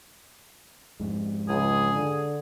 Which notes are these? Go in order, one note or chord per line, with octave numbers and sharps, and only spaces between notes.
F2 G#2 G#3
C#2 G#4
D3